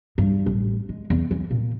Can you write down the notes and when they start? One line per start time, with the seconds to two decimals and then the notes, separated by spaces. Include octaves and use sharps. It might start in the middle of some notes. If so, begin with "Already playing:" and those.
0.18 G2
0.46 A1
0.89 G#3
1.10 E2
1.31 E3
1.51 A#2